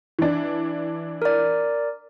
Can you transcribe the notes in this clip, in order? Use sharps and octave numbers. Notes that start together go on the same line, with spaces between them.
E3 D4
A#4 D5